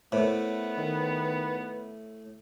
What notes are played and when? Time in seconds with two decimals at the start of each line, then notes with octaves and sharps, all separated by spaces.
0.12 A2 B3 A#4 C5 C#5
0.78 D#3